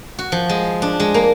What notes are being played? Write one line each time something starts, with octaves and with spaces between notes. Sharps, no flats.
F#4
F3
G#3
D4
G#3
A#3